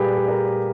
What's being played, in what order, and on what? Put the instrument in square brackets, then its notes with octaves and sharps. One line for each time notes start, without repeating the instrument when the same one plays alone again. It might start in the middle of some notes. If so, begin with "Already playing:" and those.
Already playing: [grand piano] A#2 G3 A#3 G4 G#4 B4
G#4
A#4
G#4